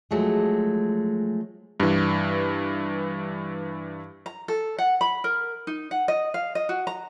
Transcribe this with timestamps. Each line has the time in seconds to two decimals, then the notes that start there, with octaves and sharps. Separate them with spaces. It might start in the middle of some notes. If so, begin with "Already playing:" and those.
0.11 F3 F#3 G#3 A3
1.80 G2 E3
4.26 A#5
4.48 A4
4.78 F#5
5.01 B5
5.24 A#4
5.67 D#4
5.91 F#5
6.08 D#5
6.34 F5
6.55 D#5
6.69 F#4
6.87 A#5